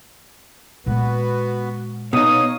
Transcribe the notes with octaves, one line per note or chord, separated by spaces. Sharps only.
A#2 G#3 B3 F#4 B4
B2 D#4 C#5 D#5 F5 D#6